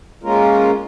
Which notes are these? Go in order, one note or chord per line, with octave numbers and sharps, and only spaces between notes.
G#3 A#3 C#4 F4 A#4